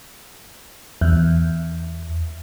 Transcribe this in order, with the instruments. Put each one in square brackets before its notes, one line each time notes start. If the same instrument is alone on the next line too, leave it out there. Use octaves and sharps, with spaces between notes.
[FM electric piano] E2